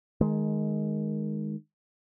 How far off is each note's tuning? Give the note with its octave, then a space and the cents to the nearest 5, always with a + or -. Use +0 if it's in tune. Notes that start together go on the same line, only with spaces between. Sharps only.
D#3 +0 G#3 +15